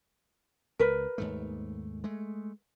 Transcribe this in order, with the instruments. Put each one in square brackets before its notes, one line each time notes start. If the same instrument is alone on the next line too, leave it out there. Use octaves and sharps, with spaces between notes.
[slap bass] C#2 [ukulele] A#4 B4
[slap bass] D#2 G#2 A3
G#3 A3